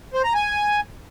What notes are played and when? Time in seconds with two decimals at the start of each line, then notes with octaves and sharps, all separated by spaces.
0.13 C5
0.24 A#5
0.34 G#5